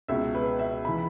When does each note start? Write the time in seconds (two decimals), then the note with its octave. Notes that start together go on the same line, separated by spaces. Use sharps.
0.08 C#2 B2 E5
0.35 B4
0.59 E5
0.85 E3 B5